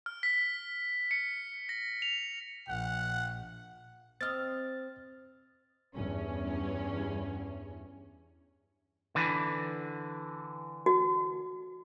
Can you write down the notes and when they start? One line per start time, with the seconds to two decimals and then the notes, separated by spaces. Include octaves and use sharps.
0.06 F6
0.23 B6
1.11 C#7
1.69 A#6
2.02 F7
2.69 A#1 F#5
4.21 C4 D#5 F6 A6
5.94 E2 G2 C#4
9.15 D3 E3
10.86 F#4